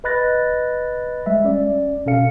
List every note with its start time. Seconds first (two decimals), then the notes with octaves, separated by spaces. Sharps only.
0.04 B4 D#5 B5 F#6 A6 A#6
1.26 G3 G#3 E5
1.44 C#4 D5
2.06 B2 C#4 A4 F5 C#7